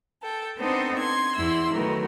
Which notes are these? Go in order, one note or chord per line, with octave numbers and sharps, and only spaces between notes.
A4 G5
B3 C4 D4 D#4 A4 C5
C6 G#6
E2 E4 C6 E6
D#3 F#3 A3 B3 A#4